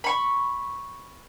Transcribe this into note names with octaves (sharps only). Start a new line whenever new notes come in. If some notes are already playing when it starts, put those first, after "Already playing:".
B5 C#6